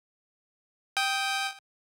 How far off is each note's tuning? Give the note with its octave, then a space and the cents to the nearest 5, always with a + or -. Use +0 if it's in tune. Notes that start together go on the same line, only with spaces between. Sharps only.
G5 +0 D#6 +15